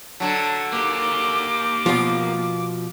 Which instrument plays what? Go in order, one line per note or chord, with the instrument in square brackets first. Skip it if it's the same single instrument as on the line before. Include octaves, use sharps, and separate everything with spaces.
[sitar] D3 F#3 [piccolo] A5
[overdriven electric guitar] A#3 G4 [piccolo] D6
[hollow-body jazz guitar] B2 F3 [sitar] F4